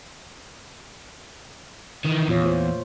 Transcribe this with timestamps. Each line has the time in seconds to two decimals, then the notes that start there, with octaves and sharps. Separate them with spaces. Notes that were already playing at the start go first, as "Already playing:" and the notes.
2.05 D#3 E3
2.28 E2 A#2 F4 C#5
2.43 A3 F4 C5